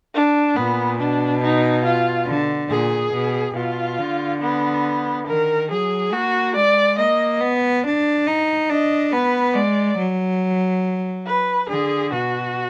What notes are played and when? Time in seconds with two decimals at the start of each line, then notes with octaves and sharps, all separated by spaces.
0.14 D4
0.56 A#2 B3
1.00 B2 D4
1.43 D#4
1.85 F4
2.27 D3
2.70 A#2 G#4
3.14 B2
3.56 B2 F4
3.98 D3
4.41 B3
5.27 D#3 A#4
5.70 F#3 G#4
6.12 A#3 F#4
6.56 G#3 D5
6.98 A#3 D#5
7.41 B3
7.84 D4
8.27 D#4
8.69 D4 D#5
9.13 B3 B4
9.55 G#3 D5
9.98 F#3
11.26 B4
11.69 D3 G#4
12.12 B2 F#4